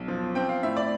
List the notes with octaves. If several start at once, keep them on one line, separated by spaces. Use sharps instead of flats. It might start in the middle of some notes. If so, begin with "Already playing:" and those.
Already playing: B1
F3
C4 G5
F5
A2 E5
D5